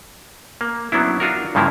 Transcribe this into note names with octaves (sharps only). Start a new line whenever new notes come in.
A#3
F#3 B3 C#4 D4 E4
D4 F4 F#4 A#4
G2 C#3 F3 A#3 E4